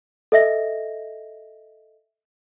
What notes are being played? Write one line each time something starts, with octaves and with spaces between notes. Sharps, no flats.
A4 D#5 E5 A#6